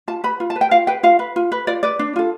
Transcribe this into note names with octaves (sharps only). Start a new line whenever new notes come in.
F4 A5
B4 B5
F4
A5
B4
G5
F4 F5
B4 G5
F4 F5
B4
F4
B4
F4 D5
B4 D5
D4
F4 A4